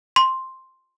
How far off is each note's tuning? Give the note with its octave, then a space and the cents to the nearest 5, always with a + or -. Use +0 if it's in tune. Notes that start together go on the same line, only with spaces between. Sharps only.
C6 +5